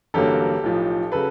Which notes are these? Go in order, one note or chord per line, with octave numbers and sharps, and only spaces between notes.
A1 G2 D3 F#3 A#3 G4 A4
B1 A2 F3
C#3 F#3 A4 B4